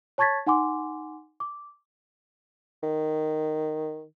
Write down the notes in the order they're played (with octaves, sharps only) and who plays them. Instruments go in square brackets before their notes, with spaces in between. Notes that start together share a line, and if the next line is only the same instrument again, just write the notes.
[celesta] C#5 A5 C#6 G#6 A6 B6
D#4 F#5 G#5 C6 D6
D6
[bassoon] D#3